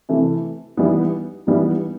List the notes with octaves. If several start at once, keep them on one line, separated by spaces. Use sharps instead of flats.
C3 E3 A3
E3 G3 B3 D#4
E3 G3 B3 D#4